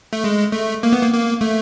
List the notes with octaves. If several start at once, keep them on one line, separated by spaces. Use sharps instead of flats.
A3
G#3
A3
A#3
B3
A#3
A#3
A3